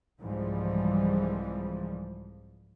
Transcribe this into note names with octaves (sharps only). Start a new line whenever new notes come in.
C2 G#2 E3 F3 G3